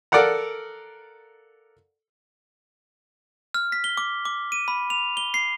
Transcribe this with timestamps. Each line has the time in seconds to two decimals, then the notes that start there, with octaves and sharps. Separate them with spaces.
0.12 A4 A#4 D5 F5 F#5 A#5
3.54 F6
3.72 B6
3.84 G7
3.97 D6
4.25 D6
4.52 D#7
4.68 B5
4.90 F7
5.17 G7
5.34 C7